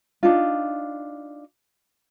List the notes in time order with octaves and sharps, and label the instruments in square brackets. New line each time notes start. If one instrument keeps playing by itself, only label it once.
[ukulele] D4 D#4 F4